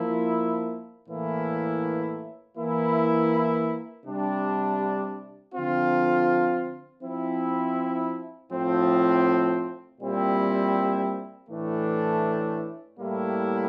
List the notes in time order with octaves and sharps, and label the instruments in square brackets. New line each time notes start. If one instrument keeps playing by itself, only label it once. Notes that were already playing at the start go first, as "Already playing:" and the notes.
Already playing: [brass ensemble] F3 A#3 E4
A2 E3 A#3 E4
E3 A#3 E4
C3 G3 D4
D3 F3 C4 F4
F3 C4 E4
A2 F3 C4
A#2 G3 C4 E4
A2 E3 A3 D4
A2 G3 A#3 E4